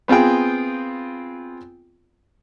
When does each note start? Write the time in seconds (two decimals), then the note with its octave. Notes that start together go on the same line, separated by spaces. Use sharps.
0.08 B3 C4 F4 G#4 G5